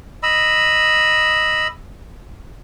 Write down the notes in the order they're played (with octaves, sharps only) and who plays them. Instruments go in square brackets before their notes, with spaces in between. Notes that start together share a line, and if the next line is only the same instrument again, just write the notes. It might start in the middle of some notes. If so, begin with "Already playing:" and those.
[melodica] D#5 B5 E6